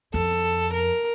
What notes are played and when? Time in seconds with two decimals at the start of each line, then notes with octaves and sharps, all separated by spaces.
0.14 F2 A4
0.73 A#4